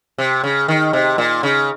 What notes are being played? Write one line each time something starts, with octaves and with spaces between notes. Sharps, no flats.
C3
C#3
D#3
C3
A#2
C#3